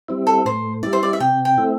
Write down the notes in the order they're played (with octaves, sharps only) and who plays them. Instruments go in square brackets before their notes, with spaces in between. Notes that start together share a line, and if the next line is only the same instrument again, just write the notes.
[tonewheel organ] G3 C4 E4
[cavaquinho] A4
[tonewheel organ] A2 [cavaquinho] C5
[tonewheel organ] G3 E4 [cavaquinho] D5
[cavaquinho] C5
D5
E5
[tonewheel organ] C3 [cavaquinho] G5
[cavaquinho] G5
[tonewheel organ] A3 C4 E4